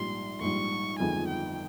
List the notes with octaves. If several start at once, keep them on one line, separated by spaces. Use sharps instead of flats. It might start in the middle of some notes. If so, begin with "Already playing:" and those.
Already playing: A#1 G#2 G3 C6
A#1 G#2 G3 C#6
G1 F2 D#3 G#3 G#5
G5